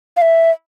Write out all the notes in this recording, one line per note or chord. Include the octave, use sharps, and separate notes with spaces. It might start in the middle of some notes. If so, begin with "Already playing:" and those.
F5
E5